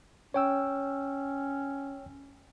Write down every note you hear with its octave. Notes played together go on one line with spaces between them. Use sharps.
C#4 C#5 G5 E6